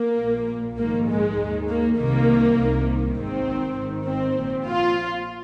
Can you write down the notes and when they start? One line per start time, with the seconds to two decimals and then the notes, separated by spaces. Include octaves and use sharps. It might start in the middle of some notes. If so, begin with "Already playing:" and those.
Already playing: A#3
0.18 A#1 A#2
0.78 A#1 G#2 D#3 A#3
1.09 G#3
1.38 D#2 D#3
1.68 A#3
1.98 C2 C3 D#3 A#3
2.57 C2 C3 D#3
3.17 G#1 G#2 D#3 C4
3.78 G#1 G#2 D#3
4.07 C4
4.38 A#1 A#2
4.68 F4